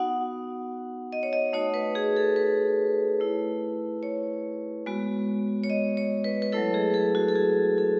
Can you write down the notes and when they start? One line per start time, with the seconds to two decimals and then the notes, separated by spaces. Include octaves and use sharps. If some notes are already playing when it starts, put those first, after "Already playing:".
Already playing: B3 D#4 F#4 F#5
1.13 D#5
1.23 C#5
1.33 D#5
1.53 A3 D#4 F#4 C#5
1.74 B4
1.95 G#4
2.17 A4
2.36 B4
3.20 A3 E4
4.03 C#5
4.86 G#3 B3 F#4
5.64 C#5
5.70 D#5
5.97 C#5
6.24 B4
6.42 B4
6.52 F#3 A3 E4 A4
6.74 G#4
6.94 A4
7.15 F#4
7.29 A4
7.36 G#4
7.78 A4